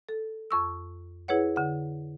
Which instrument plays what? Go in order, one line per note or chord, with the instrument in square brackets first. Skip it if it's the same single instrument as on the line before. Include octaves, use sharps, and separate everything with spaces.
[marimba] A4
F2 C#6 E6
E4 G#4 B4 C#5 F#5
D3 F#5